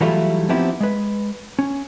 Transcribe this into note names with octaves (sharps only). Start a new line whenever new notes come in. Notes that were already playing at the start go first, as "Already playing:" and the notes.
E3 F#3 G3 A3 E4 F4
F3 B3 C4 D#4 E4 G4
G#3 B4
C#4